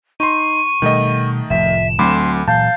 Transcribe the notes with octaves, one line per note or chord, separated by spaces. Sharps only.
D#4 C6 C#6 D#7
B2 D#3 G3 A3 D#5
F1 A2 F3 E5 E7
D2 F#3 C4 B5 C6 D6
A#2 E3 F#3 F5 A5 G6